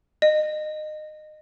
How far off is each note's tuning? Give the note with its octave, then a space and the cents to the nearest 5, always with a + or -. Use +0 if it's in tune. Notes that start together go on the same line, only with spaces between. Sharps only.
D#5 -25